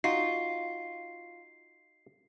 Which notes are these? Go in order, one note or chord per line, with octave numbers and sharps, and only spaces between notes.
D#4 F4 F#4 C7